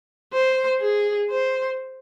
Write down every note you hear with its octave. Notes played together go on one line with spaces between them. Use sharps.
C5
G#4
C5